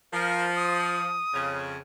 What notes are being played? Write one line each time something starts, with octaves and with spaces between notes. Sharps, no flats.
F3 A#4
D#6
F2 C#3